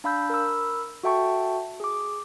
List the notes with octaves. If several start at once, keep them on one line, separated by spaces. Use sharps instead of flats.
D4 F5 B5 E6 G6
A#4 B5 E6
F#4 A4 E5 G5 A5 C#6
G#4 D6